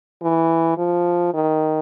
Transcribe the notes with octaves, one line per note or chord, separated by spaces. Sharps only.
E3
F3
D#3